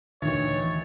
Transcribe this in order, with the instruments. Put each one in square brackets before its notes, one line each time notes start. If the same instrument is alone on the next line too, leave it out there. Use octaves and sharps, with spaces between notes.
[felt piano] D2 D#3 [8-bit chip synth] A#2 E3 A6 [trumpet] C#5